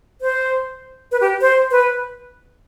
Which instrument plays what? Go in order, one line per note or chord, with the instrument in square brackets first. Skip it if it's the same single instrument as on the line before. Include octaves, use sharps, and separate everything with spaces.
[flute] C5
B4
G4
C5
B4